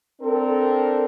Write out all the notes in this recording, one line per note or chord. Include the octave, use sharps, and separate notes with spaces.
C4 D4 A4 A#4